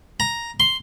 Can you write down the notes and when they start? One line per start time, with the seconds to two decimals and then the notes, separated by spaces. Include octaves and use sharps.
0.20 A#5
0.60 C6